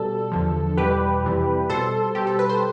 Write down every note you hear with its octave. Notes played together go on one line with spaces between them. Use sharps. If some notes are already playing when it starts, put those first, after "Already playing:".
Already playing: B2 G3 A4
E2 D3 F3
E2 B2 G3 G4 B4
F2 C3 E3 G3
B2 G3 A4 C5
B2 G3 G4
A4
B4
C5